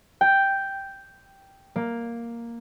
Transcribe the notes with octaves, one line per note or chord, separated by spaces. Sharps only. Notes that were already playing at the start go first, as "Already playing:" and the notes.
G5
A#3